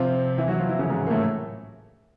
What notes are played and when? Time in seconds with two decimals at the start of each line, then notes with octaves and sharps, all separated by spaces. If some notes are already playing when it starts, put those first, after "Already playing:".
Already playing: C3 F3 C4 F4
0.38 E3 E4
0.48 F#3 F#4
0.59 F3 F4
0.69 E3 E4
0.79 C#3 C#4
0.89 G#2 G#3
1.07 A#3
1.10 A2 A3